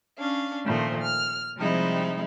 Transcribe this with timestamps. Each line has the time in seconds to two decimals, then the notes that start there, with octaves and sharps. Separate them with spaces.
0.19 C#4 D4 F5
0.65 A#2 D#3 F3 A3 C5
1.01 F6
1.56 C3 F3 G3 G#3 D#4 E4